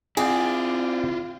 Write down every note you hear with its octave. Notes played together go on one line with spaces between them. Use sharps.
C4 E4 F4 G#4 D5 F#5 G5